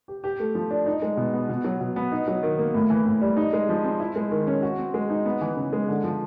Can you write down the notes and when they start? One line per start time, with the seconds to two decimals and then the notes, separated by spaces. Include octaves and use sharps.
0.08 G4
0.24 G4
0.39 A3
0.55 F3
0.71 D4
0.86 D#4
1.02 G#3
1.17 B2
1.34 B3
1.49 B2
1.64 F#3
1.81 B2
1.96 B3
2.12 D#4
2.28 F#3
2.43 D#3
2.59 A#3
2.74 A2
2.90 E3
3.06 A2
3.21 G3
3.37 D#4
3.53 G#3
3.69 F3
3.84 C4
4.00 E4
4.16 G#3
4.31 D#3
4.47 C#4
4.63 F#4
4.79 C4
4.94 G#3
5.10 D#4
5.25 B3
5.41 E3
5.57 C#3
5.73 G#3
5.88 D3
6.04 F3